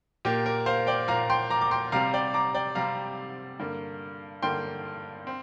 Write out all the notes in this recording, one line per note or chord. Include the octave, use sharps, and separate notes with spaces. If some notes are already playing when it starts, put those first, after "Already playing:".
A#2 A#3 G4
A#4
C5 F5
D5 G5
A#2 A#3 F5 A#5
G5 C6
A#5 D6
D6
G5 C6
C3 G3 C4 F5 A#5
D5 G5
A#5 D6
D5 G5
C3 G3 C4 F5 A#5
G2 D3 A#3
G2 D3 A#3 G5 C6
C4